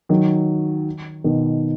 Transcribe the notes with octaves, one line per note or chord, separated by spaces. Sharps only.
D#3 F#3
B2 D#3